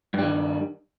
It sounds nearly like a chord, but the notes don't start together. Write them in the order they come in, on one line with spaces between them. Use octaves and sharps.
G2 G3 D#3